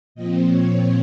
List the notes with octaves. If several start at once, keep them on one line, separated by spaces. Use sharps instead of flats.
A#2 F3 C4 D#5
C#5